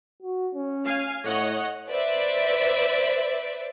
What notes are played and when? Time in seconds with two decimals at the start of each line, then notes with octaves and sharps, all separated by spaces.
0.22 F#4
0.55 C#4
0.85 F5 G#5
1.25 A2 C#5 D#5 F#5
1.89 B4 C5 D5 E5